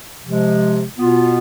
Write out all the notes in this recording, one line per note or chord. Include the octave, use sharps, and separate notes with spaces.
C3 F3 G#3
B2 B3 F4